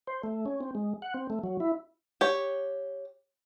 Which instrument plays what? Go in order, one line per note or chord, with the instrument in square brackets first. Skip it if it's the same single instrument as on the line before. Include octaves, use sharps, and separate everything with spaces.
[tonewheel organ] C5
A3
C#4
C4
G#3
F#5
C4
A3
F#3
E4
[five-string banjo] G4 C#5